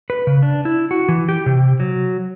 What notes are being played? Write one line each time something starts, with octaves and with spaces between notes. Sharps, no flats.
B4
C#3
D4
E4
F#4
E3
G4
C3
F#3